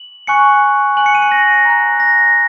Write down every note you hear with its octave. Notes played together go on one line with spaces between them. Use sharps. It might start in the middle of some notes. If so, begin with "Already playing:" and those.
Already playing: F#7
G#5 C#6 F#6 C#7
G#5 F#6 F#7
C#7
D#7
C#7
A#6
A#5 F#6
A#6